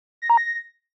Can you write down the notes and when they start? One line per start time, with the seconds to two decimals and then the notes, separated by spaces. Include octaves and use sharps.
0.22 A#6
0.30 A#5
0.37 A#6